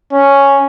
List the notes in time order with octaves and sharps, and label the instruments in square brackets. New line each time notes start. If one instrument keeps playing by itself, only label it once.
[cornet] C#4